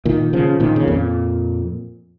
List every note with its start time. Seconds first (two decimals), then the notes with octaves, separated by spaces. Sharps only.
0.05 A#2 D#3
0.33 C#3 F3
0.60 A#2 D#3
0.76 C#3
0.87 F2 A#2